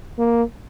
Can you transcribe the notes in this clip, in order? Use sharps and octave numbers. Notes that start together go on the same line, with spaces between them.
A#3